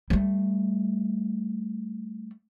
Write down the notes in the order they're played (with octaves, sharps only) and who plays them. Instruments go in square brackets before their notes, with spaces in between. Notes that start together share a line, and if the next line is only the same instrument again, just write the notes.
[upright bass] G3 A3